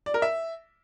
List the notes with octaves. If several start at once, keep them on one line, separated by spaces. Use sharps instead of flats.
D5
A#4
E5